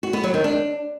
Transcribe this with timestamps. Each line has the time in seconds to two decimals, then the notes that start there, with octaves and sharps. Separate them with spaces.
0.03 F#4
0.13 B3
0.24 F#3
0.34 D#3
0.44 D4